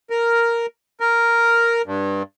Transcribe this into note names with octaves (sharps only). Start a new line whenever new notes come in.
A#4
A#4
G2